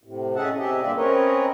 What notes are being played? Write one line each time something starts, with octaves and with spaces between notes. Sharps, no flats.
A2 C3
C#4 D#4 G#4 E5 F#5 A5
C3 G4 G#4 D#5 E5
G2 A#2 F4 D5 E5
C4 C#4 A#4 B4 C#5 D#5